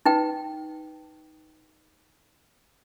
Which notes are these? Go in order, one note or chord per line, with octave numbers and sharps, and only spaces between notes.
D#4 B4 G5